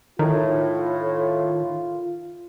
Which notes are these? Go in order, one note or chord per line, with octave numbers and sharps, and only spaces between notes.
A2 D#3 F4